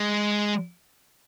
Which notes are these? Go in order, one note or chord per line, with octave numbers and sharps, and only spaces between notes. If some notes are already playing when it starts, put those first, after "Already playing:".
Already playing: G#3